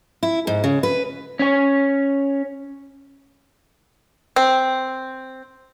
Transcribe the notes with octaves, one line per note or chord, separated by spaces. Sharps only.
E4
G#2
C#3
B4
C#4 C#5
C4